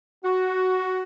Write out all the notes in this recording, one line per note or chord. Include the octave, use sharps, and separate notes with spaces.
F#4